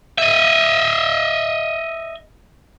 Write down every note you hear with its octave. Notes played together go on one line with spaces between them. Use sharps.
D#5 E5